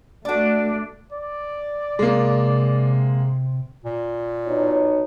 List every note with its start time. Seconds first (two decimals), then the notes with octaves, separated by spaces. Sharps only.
0.25 A3 D4 F#4 D5
1.13 D5
1.99 C3 G#3 A#3
3.84 A#2
4.47 B2 D#4 C#5